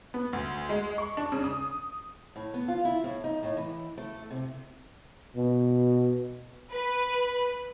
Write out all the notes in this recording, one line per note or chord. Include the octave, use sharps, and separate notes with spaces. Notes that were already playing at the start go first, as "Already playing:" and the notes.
B3
D2
G#3
C#6
D4
C#3
D#6
A2
B3
F4
E4
A2
D#4
A2
E3
A3
C3
B2
B4